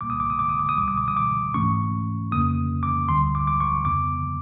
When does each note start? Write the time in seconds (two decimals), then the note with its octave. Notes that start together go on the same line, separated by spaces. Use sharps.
0.01 C2 A#2 G3 A#3 D6
0.10 D#6
0.20 D6
0.30 D#6
0.39 D6
0.49 D#6
0.59 D6
0.69 D#6
0.78 C#2 B2 G3 D6
0.88 D#6
0.98 D6
1.08 D#6
1.17 D6
1.54 G#2 E3 A3 C#4 C#6
2.32 F2 C#3 F#3 A#3 C#4 D#6
2.83 D6
3.09 D2 D3 G3 C6
3.35 D6
3.47 D6
3.60 C#6
3.85 F2 C#3 F#3 B3 D6